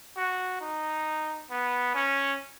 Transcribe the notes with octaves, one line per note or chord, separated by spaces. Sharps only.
F#4
D#4
B3
C#4